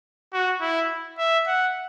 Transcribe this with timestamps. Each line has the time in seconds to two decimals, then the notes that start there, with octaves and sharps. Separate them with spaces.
0.33 F#4
0.61 E4
1.18 E5
1.47 F#5